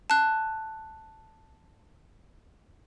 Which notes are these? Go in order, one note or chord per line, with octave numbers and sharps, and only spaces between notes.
A5 F#6